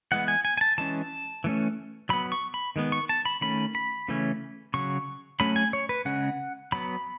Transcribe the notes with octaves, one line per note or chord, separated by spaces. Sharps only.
E3 G#3 B3 F#5
G#5
G#5
G#5
A5
E3 G#3 C#4 A5
E3 A3 C#4
F#3 B3 B5
C#6
B5
D#3 G#3 B3
C#6
A5
B5
D#3 A3 C#4 B5
B5
C#3 E3 A3 C#4
C#3 F#3 C#6
F#3 A3 C#4 B5
G#5
C#5
B4
C#3 G#3 C#4 F#5
F#3 B3 B5